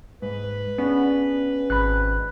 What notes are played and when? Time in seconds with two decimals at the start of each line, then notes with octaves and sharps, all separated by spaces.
0.22 G#2 B4
0.78 B3 C#4 D4 G#4
1.70 G#1 B5 F#6